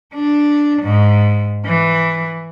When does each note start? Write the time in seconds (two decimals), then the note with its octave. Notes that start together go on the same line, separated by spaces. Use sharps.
0.14 D4
0.82 G#2
1.65 E3